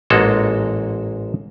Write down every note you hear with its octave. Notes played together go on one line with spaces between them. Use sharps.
A1 G#2 G#3 A#3 F#4 A4